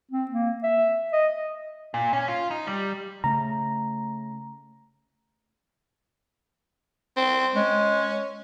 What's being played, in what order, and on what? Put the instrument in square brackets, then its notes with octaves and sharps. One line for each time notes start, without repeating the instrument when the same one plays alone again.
[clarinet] C4
A#3
E5
D#5
[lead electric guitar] A#2
C#4
F4
D#4
G3
[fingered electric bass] C#3 A3 [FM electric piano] A#5
[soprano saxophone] C4
[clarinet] G#3 [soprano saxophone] C#4